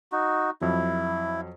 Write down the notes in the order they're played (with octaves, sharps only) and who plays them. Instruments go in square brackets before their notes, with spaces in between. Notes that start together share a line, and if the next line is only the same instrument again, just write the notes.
[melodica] D#4 F#4
[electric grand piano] F2 F#3 [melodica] E4